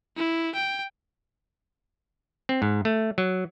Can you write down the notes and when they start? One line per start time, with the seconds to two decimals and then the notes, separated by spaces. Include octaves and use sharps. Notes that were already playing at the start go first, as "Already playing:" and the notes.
0.17 E4
0.55 G5
2.49 C4
2.62 G#2
2.85 A3
3.18 F#3